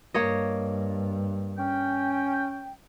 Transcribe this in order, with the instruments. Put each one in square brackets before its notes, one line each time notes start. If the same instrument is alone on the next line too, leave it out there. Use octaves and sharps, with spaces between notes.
[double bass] G2 [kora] A#3 C#5 D#5
[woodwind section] C#4 G5